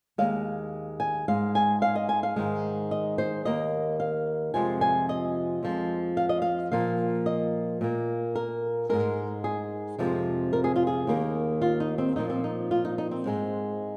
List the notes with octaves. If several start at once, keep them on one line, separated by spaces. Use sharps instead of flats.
D#2 D#3 G#3 F5
G#5
G#2 G#3 F5
G#5
F5
D#5
G#5
F5
G#2 D#3 G#3
D#5
C5
D#2 D#3 A#3 D#5
F5
F2 C3 F3 G#3 G#5
G#5
D#5
F2 F3 G#3
F5
D#5
F5
A#2 F3 A#3 F5
D#5
A#2 A#3
A#4
G#2 G#3 A#4
G#4
F2 C3 F3 G#3
A#4
G#4
F4
G#4
D#2 D#3 A#3
F4
D#4
C4
A#2 F3 A#3 D#4
C4
D#4
F4
D#4
D#4
C4
G#2 G#3